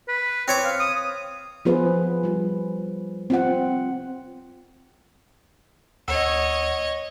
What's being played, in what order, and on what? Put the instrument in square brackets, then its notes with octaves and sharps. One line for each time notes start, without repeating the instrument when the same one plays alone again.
[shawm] B4
[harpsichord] C4 C#5 D6
[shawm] F5
D#6
[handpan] F3 B3 F4 G#4 B4 C5
G3 F4
C4 F4 F#5
[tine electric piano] D2 F#5 E6 [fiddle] C#5 D#5